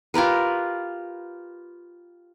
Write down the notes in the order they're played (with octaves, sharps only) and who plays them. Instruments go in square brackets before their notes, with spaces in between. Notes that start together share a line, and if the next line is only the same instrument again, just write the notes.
[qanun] F4 G4 A#4 B4